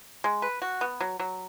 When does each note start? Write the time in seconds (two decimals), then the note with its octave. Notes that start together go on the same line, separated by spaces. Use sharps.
0.24 G#3
0.42 B4
0.62 F#4
0.81 B3
1.00 F#3
1.20 F#3